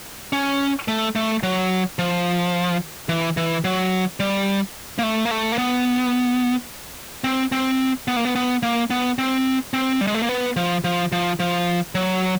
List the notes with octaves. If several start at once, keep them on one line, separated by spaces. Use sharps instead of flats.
C#4
A3
A3
F#3
F3
E3
E3
F#3
G3
A#3
A3
A#3
A3
A#3
B3
C4
C4
B3
A#3
B3
B3
A#3
B3
C4
C4
G3
G#3
A3
A#3
B3
F3
F3
F3
F3
F#3